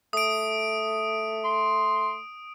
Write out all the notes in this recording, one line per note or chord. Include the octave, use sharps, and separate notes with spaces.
A3 D#6 D7
C6